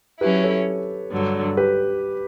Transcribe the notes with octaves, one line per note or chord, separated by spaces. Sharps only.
F#3 C#4 E4 G4 B4
A4 C#5
G2 D3 F#3
G4 B4